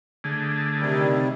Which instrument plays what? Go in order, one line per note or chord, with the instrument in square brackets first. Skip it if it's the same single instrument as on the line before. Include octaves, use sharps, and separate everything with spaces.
[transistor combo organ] D3 A3 G#4
[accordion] C3 D#3 G3